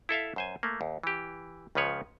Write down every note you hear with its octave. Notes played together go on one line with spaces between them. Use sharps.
E4 A4 E5 F5
F#2 C5 G#5
A3 A#3
D#2
E3 G4
C#2 C#3 F3 B4 C#5